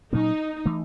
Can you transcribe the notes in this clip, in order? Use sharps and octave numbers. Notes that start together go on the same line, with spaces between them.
A#2 F#3 A#3 C#4 D#4
E3 A3